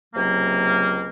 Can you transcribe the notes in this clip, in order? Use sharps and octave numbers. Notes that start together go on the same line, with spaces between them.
C#2 C3 F#3 A#3